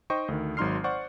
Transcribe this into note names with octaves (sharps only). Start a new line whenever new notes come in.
D#4 C5 D#5 G5 C#6
D2 D#3
G#1 F#3 D#4 C6 F6 C7
C5 D5 F#5 C#6